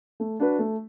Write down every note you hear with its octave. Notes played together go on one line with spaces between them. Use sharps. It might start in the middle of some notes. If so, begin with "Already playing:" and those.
A3
D4 F#4 B4
A3